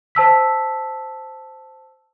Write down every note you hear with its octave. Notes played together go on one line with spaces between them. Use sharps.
C5 A5 E6 B6